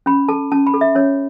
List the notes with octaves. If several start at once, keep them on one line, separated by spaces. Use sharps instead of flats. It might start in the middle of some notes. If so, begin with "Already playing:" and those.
C#4 B5
A4 A5
C#4 A5
B5
A4
E5
C#4 C#5